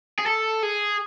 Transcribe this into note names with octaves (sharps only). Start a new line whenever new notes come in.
G#4
A4
G#4